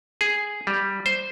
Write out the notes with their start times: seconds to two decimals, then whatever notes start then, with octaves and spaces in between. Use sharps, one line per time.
0.21 G#4
0.67 G3
1.06 C5